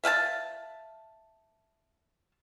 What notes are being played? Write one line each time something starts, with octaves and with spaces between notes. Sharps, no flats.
E5 F5 G5 A5